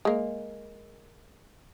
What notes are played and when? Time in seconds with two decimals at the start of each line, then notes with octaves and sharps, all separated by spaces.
0.05 G#3 A#3